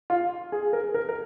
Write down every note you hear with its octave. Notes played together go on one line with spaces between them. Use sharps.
F4
G#4
A#4
A#4
A#4